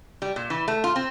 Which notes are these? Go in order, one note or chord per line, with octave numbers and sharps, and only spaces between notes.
G3
A#2
E3
A3
F4
C4